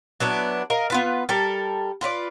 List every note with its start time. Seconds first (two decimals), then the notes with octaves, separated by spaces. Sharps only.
0.20 F#3 B3 D4 E4
0.70 A#4 D#5 F5
0.90 B3 F4 B4
1.29 G3 A4 A#4
2.01 F4 B4 C#5 D5